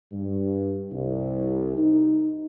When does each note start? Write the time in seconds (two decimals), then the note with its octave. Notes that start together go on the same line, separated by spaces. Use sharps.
0.12 G2
0.92 C2
1.78 D#4